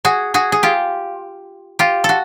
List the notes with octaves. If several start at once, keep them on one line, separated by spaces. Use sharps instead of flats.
F#4 G#4
F#4 G#4
G#4
F4 G4
F4 G4
F#4 A4